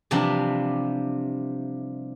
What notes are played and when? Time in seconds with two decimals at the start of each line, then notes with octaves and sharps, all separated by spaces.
0.11 C3 E3 F3 G3 D4 G4